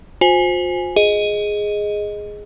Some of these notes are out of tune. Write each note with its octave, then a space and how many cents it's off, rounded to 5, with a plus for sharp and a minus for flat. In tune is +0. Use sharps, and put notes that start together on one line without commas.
F4 +45 C5 -5 G#5 +0
G#4 +0 D#5 +0